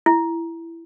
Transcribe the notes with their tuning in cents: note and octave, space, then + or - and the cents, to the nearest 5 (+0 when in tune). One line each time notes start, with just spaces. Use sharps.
E4 +15